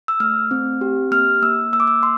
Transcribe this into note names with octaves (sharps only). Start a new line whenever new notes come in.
E6
A3 F6
C4
G4
A#3 F6
A#3 E6
A#3 E6
D6
E6
C6